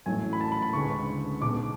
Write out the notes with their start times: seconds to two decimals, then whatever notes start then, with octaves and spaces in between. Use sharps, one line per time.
0.06 A1 A2 F#3 A3 C#4 G#5
0.33 B5
0.41 A5
0.52 B5
0.62 B5
0.73 D2 C#3 G#3 B3 C#6
1.41 B1 B2 G#3 B3 D6